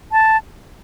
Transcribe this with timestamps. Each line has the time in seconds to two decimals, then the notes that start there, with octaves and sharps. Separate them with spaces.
0.12 A5